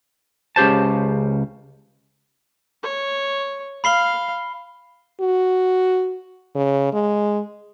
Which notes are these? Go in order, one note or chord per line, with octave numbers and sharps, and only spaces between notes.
C#2 C#3 G4 C5 A5
C#5
F5 B5 C7 G7
F#4
C#3
G#3